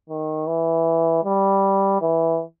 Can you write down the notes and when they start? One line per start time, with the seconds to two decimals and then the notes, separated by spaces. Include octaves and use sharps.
0.09 D#3
0.47 E3
1.24 G3
2.01 E3